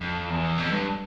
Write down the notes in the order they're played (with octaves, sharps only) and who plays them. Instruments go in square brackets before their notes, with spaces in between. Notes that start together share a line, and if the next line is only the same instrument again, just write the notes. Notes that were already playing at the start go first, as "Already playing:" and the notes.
[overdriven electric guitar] F2
E2
F2
G2